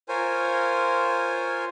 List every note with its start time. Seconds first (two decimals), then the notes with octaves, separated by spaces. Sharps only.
0.09 F4 A#4 C5 C#5 G#5